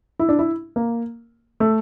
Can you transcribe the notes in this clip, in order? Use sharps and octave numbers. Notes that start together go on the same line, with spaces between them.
E4
D4
E4
A#3
A3